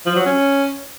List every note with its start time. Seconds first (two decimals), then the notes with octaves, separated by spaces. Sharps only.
0.06 F3
0.16 F#3
0.26 C#4